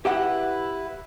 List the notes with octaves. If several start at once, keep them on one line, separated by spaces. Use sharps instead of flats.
E4 G4 B4 E5 F#5